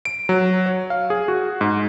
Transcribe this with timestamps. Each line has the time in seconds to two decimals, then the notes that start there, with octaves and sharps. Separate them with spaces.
0.05 D7
0.29 F#3
0.66 C#5
0.90 F5
1.10 G#4
1.28 F#4
1.61 G#2